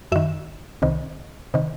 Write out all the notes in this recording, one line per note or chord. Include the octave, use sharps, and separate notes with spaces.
F#2 D#3 E5
C2 C3 D#3
C3 D#3